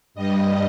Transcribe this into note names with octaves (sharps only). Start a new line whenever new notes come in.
G2 G3 D#5